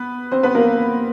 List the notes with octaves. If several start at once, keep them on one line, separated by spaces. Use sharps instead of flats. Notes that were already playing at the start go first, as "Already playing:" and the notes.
Already playing: B3 B4
C4 C5
B3 B4
A#3 A#4